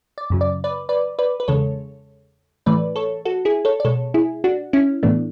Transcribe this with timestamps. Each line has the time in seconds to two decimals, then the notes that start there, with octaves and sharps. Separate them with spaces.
0.18 D5
0.30 F#2 C#3 F#3
0.41 D5
0.64 B4 D5
0.89 B4 D5
1.19 B4 D5
1.40 B4
1.48 E2 C#3 G#3 A4 C#5
2.66 A2 E3 A3 B4 D5
2.96 A4 C#5
3.25 F#4 A4
3.45 E4 G#4
3.65 A4 C#5
3.80 D5
3.85 B2 G#3 A4 C#5
4.14 E4 G#4
4.44 D4 F#4
4.73 C#4 E4
5.03 A2 E3 A3 B3 D4